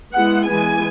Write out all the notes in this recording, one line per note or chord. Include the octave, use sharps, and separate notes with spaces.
G#3 B3 E4 F#5
E3 G#3 B3 G#5